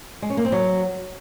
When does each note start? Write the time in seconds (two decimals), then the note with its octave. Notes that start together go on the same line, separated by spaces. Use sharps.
0.22 G#3
0.30 C#4
0.37 A#3
0.45 C4
0.52 F#3